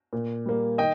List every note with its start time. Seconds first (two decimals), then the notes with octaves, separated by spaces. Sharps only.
0.13 A#2
0.46 G3 A#3
0.78 D#3 D#5 G5